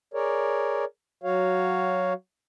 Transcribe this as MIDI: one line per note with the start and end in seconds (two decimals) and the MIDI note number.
0.14 0.85 68
0.14 0.85 70
0.14 0.85 73
0.14 0.85 74
1.23 2.13 54
1.23 2.13 66
1.23 2.13 73
1.23 2.13 77